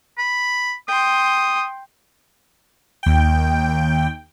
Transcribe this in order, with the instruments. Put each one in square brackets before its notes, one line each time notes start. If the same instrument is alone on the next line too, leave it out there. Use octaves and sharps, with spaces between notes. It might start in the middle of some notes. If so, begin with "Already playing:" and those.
[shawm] B5
[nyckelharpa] G5 C6 [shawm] D#6
[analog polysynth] D#2 G5